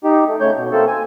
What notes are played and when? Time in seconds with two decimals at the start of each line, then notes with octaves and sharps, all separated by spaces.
0.04 D#4 G4
0.27 A3
0.40 C#3 A3 C#5 G6
0.56 B2
0.72 A3 A#3 C4 A4
0.87 G#5